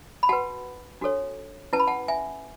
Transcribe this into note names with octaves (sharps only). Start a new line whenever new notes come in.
B5
F#4 B4 F#5 A5
D4 F#4 A4 C#5
C#4 E4 B4 A5
B5
F#5 A5
E5 G#5